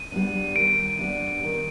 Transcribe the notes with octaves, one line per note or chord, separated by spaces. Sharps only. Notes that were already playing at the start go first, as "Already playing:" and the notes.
Already playing: D#7
G3 B3 D4
D#3 D7
G3 B3 D4
D#3